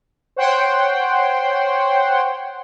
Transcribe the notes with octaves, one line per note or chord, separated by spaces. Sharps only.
C5 C#5 F#5 G5 C6